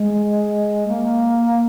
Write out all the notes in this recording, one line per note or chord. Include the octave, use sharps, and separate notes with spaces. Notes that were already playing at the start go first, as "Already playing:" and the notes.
Already playing: G#3
A#3